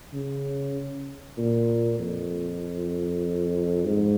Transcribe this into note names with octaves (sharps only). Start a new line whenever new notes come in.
C#3
A#2
F2
G#2